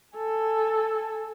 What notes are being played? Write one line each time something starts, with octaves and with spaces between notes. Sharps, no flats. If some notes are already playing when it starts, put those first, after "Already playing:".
A4 G#5